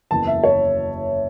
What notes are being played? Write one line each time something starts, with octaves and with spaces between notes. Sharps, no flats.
F#1 E2 E3 A5
E5
C#5